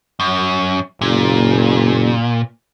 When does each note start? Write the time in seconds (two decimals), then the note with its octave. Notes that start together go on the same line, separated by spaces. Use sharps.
0.20 F#2
1.01 F#1 A#2